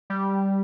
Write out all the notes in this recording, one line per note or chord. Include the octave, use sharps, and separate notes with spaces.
G3